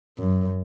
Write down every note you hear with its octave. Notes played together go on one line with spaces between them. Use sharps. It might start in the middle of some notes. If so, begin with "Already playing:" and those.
F#2